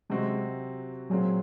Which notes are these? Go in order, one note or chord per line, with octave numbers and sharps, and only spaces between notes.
C3 F#3 G#3 C4 F#4
A#2 F#3 G#3 C4 F4